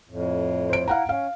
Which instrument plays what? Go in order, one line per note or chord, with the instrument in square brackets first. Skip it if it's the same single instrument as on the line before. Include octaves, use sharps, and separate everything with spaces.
[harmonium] F2 A2
[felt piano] C5 D7
[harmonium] E4 [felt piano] F5 F#5 A#5
[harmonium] C#4 [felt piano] F5